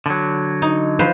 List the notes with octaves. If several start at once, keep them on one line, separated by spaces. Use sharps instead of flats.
D3 F#3
D#4
F3 B4 C5